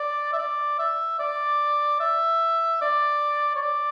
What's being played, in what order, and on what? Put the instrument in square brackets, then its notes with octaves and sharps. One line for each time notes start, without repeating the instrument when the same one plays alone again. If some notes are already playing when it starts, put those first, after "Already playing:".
Already playing: [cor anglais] D5
E5
D5
E5
D5
E5
D5
C#5
D5